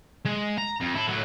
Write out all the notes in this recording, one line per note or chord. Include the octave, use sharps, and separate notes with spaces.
G#3
A#5
F2
E4 A4
A2 F#3